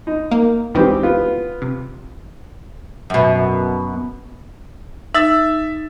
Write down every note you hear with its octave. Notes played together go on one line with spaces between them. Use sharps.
D#4
A#3
C#2 D#3 E3 C4 G4
B3 F4
C3
F#2 B2
D#4 E5 E6 A6